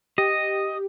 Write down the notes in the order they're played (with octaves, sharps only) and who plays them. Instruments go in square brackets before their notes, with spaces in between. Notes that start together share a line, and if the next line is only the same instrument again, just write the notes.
[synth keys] G4 [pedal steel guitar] D#5